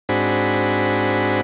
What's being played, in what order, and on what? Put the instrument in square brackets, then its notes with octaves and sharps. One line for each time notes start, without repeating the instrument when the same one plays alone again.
[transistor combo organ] G#2 C4 D4 F#4 G#4 B5